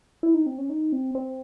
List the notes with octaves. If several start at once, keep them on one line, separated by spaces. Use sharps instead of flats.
E4
D#4
C4
C#4
D#4
C4
C4